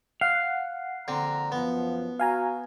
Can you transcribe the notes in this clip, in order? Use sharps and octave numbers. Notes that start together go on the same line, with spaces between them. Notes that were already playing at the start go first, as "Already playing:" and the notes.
F5 F#5
A#1 D3 C4 A#5
F#2 F3 B3
F#4 F5 G#5 A#5